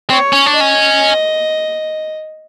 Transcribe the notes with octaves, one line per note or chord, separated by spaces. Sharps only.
C4 C#5
C#4
D4
D#5
C#4